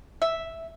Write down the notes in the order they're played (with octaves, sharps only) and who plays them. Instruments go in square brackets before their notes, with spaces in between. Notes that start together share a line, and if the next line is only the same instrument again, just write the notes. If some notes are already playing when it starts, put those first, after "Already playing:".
[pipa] E5